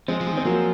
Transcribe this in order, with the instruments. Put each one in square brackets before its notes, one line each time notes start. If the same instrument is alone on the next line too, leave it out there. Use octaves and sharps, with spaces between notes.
[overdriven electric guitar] F3 [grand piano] G#3 C4
[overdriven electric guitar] F3
[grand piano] G#3
[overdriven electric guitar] D#3 [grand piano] C4
[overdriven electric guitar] F3 [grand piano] F#3 A#3